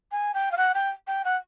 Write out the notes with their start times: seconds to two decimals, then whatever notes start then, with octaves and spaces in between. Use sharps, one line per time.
0.11 G#5
0.34 G5
0.51 F5
0.57 F#5
0.74 G5
1.07 G5
1.24 F#5